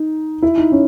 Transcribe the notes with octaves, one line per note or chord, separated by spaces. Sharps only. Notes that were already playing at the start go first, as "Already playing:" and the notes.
Already playing: D#4
E4
D#4
C#4